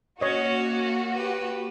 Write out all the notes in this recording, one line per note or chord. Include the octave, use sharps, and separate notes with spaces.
A#3 C#4 F#4 C#5 D#5
G4 B4